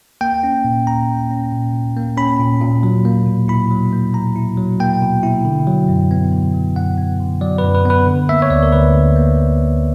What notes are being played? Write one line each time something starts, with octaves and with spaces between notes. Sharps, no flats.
A#3 G5
C#4
A#2
A#2 A#5
A#3
C#4
A#2
A#2
A#3
C#4 B5
A#2
A#2
F#3
A#3
B2
E4 B5
F#3
A#3
B2 A#5
E4
F#3
A#3 G5
B2
E4
D3
F#3
F#2
B3
D3
F#3
F#2 F#5
B3
D3
F#3 D5
F#2 B4
B4
B3 B4
D3
A#3 E5
C#5
D2 D5
A#4
D2 B4
D3
A#3
D2
D2